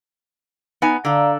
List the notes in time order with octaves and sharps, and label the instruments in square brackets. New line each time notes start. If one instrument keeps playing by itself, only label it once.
[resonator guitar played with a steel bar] B3 D#4 G#5
[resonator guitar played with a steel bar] D3 A4 [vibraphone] D5 F5 A#5